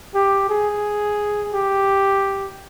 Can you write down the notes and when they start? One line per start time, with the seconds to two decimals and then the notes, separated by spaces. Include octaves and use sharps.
0.15 G4
0.50 G#4
1.54 G4